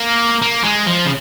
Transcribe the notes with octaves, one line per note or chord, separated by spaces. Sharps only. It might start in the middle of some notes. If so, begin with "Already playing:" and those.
Already playing: A#3
A#3
G#3
F3
C#3